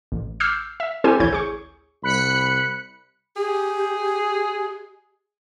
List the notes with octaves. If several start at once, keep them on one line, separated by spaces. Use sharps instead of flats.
A1
D6 E6 F6 G6 C7
E5
C4 E4 G4 A4 C5 G#5
A1 D2 E4 C#5 G6 G#6
G#4 C#6
C2 B5 F#6 C#7
G4 G#4